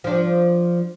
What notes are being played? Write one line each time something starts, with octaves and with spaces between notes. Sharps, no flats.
F3 D4